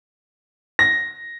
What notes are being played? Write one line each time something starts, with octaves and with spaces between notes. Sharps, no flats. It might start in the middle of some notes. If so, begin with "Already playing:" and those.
A#6